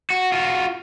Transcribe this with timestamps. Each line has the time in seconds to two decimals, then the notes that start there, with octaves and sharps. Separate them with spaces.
0.10 F#4
0.32 F4 F#4